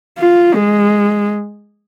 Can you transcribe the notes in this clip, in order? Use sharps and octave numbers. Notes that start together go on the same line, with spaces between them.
F4
G#3